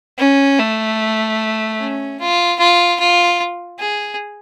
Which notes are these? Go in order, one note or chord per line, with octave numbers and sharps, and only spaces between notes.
C#4
A3
C#4
F4
F4
F4
G#4